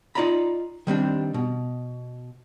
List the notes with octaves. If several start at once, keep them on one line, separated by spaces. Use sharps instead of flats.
D#4 F4 D5 D#5 A#5 B5
D#3 G3 C4 D4
B2